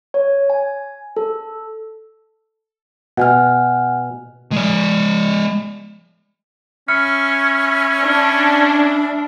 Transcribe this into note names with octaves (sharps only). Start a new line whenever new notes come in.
C#5
G#5
A4
B2 F#5 G#5 F6
G#3 D5
C#4 E5 B5 F6 C#7
D4